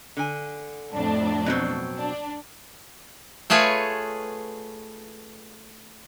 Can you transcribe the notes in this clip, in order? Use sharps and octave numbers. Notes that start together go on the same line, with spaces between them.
D3 G#5
F2 A2 D4
B2 F#3 C4
D4
A3 F4 G#4 B4 C#5